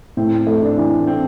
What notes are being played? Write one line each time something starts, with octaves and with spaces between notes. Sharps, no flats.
A2 C4
A3
D4
E3
C4